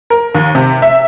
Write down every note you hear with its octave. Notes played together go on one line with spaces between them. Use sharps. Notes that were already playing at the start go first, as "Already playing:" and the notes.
A#4
D#2
C3
E5